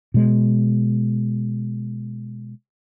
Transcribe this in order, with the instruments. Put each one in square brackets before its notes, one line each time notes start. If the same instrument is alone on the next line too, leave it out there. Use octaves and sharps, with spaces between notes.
[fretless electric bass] B2 G#3